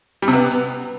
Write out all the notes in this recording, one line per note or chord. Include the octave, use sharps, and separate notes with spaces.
G3
C3
B3